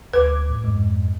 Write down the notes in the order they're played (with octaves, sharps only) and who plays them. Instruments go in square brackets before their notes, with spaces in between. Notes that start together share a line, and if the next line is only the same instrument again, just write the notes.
[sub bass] D2 [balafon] B4 [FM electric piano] D6 G#6
[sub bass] A2
[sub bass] F2 [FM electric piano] G#2